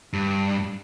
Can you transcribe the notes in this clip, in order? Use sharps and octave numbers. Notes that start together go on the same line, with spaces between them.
G2